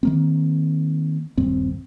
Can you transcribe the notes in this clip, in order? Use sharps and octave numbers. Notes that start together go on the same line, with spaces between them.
D#3 A#3 C4
D#1 G2 C4